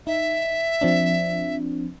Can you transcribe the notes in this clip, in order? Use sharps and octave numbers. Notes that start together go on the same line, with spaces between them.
D#4 E5
F3 C4 D4